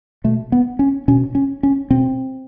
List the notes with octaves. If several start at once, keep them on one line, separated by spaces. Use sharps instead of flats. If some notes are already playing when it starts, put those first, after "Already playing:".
B2 A3
B3
C#4
B2 C#4
C#4
C#4
B2 C4